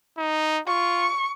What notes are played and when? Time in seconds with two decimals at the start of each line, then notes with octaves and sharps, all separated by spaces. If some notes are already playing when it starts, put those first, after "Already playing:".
0.18 D#4
0.68 F4 C#6